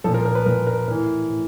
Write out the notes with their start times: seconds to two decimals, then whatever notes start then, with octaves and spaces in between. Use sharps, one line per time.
0.04 A#2 F3 A4
0.14 A#4
0.25 A#4
0.35 B4
0.46 A#2 F3 A#4
0.67 A#4
0.87 A2 E3 A#4
1.29 A2